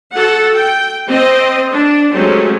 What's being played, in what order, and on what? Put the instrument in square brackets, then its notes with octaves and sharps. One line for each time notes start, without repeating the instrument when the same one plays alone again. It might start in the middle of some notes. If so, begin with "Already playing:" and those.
[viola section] F#4 A4 F#5
G5
C4 D#5
D4
F#3 G#3 A3 C4 C#4 G4